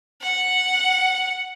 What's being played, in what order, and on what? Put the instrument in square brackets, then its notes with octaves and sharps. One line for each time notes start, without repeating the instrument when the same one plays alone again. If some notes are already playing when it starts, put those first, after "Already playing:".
[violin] F#5